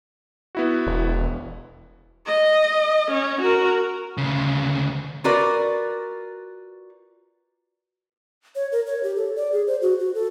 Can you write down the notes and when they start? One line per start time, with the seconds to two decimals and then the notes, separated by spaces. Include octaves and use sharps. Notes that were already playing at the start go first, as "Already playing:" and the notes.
0.55 B3 E4 F#4
0.87 E1
2.27 D#5
3.11 C#4
3.41 F#4 A#4
4.18 D2 C#3
5.24 F4 F#4 A#4 B4 D5
8.55 C#5
8.72 A#4
8.87 C#5
9.03 G4
9.16 A4
9.36 D5
9.52 G#4
9.67 C5
9.82 F#4
10.00 F#4
10.15 A4